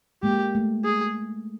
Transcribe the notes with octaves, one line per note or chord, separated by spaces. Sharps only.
G#3 A#3 G4
A3
G#4